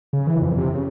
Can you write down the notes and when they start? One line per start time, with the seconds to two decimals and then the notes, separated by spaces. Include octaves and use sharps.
0.13 C#3
0.27 E3
0.41 F2
0.57 C3
0.74 C#3